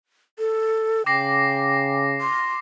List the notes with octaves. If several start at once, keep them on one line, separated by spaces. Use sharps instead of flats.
A4
C#3 G5 D6 A#6 C7
C6